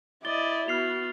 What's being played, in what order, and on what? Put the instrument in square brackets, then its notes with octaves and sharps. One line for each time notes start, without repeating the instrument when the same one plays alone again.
[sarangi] E4 [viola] D5 D#5 [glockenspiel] A6 G7
[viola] B3 F#4 [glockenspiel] F6 C7 F7